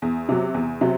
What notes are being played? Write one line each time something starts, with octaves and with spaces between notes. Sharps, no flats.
E2
C3 F#3
E2
C3 F#3